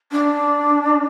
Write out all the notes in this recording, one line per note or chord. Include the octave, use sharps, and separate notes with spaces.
D4